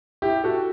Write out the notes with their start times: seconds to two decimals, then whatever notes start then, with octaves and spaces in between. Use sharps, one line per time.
0.22 E4 G4
0.44 F#4 A4